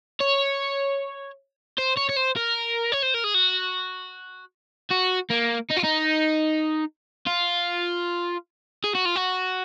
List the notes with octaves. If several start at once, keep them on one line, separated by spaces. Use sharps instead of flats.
C#5
C5
C#5
C#5
C5
A#4
C#5
C5
A#4
G#4
F#4
F#4
A#3
D#4
F4
D#4
F4
G#4
F#4
F4
F#4